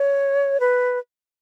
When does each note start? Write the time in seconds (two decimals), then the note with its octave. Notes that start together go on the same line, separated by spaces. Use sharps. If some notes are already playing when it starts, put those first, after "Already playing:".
Already playing: C#5
0.60 B4